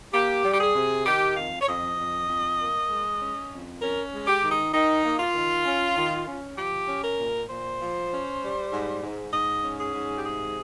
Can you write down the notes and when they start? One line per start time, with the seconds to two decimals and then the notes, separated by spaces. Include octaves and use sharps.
0.14 A#3 G4
0.45 G3
0.53 G4
0.60 G#4
0.75 C3
1.06 D#3 G4
1.37 F2 F5
1.61 C#5
1.67 F2 D#5
1.98 F2
2.28 F2
2.59 A#3
2.90 G#3
3.21 C#4
3.51 F2
3.82 C#4 A#4
4.13 G#3
4.27 G4
4.43 D#3
4.51 D#4
4.74 D#3 D#4
5.04 A#3
5.19 F4
5.35 D#3
5.65 C#4
5.96 D#3
6.27 C#4
6.58 F3 G4
6.88 C#4
7.04 A#4
7.19 A#2
7.50 A#2 C5
7.80 F3
8.11 C#4
8.42 G3
8.72 G#2
9.03 G#2
9.33 G#2 D#5
9.64 C#4
9.80 G#4
9.95 G#2
10.15 G4
10.25 C3 G#4